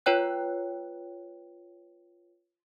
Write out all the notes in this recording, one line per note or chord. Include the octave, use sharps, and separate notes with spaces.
F4 B4 C#5 G5 F#6